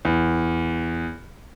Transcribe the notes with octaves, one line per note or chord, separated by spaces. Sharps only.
E2